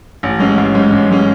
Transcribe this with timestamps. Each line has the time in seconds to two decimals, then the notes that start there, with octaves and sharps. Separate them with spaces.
0.23 A1
0.39 G#2 G#3 C#4
0.58 A1
0.74 G#2 G#3 C#4
0.92 A1
1.09 G#2 G#3 C#4